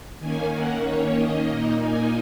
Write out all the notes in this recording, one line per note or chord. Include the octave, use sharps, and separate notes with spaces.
D#3 A#3 C#4 G#5
F#5
C#5
D#5
A#2 A#3 D#4
G#5